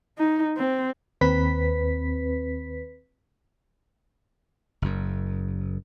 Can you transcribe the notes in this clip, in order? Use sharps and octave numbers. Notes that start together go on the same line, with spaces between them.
D#4
C4
D#2 C4 B4 B6
F#1 F#2